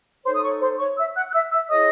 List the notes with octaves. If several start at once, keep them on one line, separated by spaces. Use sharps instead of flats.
D#4 A4 C5 C#5 C6
D#6
C#5 C#6
C5 C6
C#5 C#6
E5 E6
F#5 F#6
F#6
E5 E6
E5 E6
E4 G#4 C#5 D#5 D#6